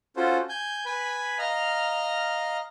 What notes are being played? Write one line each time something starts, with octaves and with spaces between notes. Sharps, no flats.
C#4 F4 F#4 A4 C5
G#5 G6
B4 G#5 B5
D#5 F5 A#5 F6